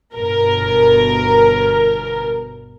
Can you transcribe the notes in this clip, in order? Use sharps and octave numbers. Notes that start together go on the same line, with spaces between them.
G1 B2 A#4